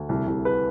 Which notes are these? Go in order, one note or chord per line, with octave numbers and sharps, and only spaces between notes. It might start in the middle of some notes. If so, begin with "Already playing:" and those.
Already playing: D2
C2
C2
B4